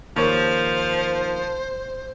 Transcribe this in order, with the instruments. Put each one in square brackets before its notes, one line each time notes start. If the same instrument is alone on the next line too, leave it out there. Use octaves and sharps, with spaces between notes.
[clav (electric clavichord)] D#2 C#5 [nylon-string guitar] D#3 [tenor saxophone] F3 [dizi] C5